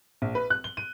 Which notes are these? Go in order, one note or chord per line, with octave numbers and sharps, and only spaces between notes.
A#1
B4
F#6
G7
D#7